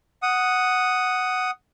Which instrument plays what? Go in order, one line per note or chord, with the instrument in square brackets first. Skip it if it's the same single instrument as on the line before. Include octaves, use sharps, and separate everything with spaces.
[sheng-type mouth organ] F#5 D#6